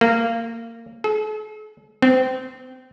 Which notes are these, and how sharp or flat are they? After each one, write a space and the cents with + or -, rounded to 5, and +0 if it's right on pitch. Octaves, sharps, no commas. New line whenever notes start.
A#3 -20
A4 -45
C4 -25